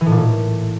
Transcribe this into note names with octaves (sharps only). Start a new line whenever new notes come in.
E3
A2
A#2
A2